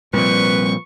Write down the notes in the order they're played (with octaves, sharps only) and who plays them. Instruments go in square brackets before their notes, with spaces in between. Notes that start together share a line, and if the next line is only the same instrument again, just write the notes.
[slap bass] A#2 F3 [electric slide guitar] G3 C4 D5 [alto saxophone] B4 [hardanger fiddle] C#6